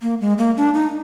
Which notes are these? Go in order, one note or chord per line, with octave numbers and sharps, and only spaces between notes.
A#3
G#3
A#3
D4
D#4